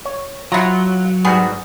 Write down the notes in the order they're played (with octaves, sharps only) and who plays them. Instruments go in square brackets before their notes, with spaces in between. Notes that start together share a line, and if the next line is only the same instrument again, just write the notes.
[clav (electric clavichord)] C#5
[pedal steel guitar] F#3 [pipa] E4 A#5 [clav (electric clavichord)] F4 C#5 F#5
[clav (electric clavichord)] G#2 G3 F#4 [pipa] B3 G#4